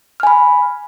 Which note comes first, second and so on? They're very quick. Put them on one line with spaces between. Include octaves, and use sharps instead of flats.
F6 G#5 B5